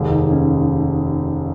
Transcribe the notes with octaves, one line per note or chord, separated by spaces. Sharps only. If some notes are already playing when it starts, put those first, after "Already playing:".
Already playing: F1 D#2 D#3 G#3
D#4
C#4